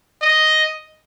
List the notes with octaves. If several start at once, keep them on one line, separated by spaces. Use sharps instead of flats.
D#5